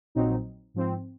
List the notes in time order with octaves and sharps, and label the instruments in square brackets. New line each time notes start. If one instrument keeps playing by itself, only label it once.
[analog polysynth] A#1 A#2 F#3 C4 D#4
G#2 F3 C4